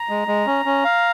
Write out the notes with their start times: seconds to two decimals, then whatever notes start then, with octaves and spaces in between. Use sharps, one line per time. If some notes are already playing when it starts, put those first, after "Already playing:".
Already playing: A#5
0.09 G#3
0.28 G#3
0.47 C#4
0.65 C#4
0.84 F5